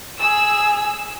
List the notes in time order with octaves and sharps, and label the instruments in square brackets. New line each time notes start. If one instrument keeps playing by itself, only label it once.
[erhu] G#4 [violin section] E6